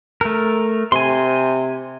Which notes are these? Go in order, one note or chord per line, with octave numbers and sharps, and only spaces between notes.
A3 A#4
C3 G#5 C6